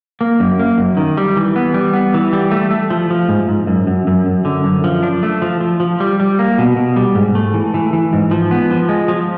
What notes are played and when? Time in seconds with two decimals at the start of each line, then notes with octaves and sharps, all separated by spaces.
0.21 A#3
0.40 F#2
0.59 A#3
0.78 F#2
0.97 D#3
1.17 G3
1.37 E3
1.56 B3
1.74 G3
1.94 B3
2.14 E3
2.33 G3
2.51 A3
2.71 A3
2.90 F3
3.10 F3
3.29 G#2
3.49 G#2
3.67 F#2
3.87 F#2
4.07 F#2
4.26 F#2
4.45 D3
4.64 F#2
4.84 F3
5.03 D4
5.23 A3
5.42 F3
5.60 F3
5.80 F3
6.00 G3
6.20 G3
6.39 A#3
6.58 B2
6.76 B2
6.96 G3
7.15 G#2
7.35 A3
7.54 E3
7.74 E3
7.93 E3
8.13 G#2
8.31 F3
8.51 B3
8.71 F3
8.89 G#3
9.08 F3